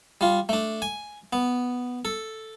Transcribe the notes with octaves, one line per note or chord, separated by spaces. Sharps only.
G3 F4
A3 D4
G#5
B3
A4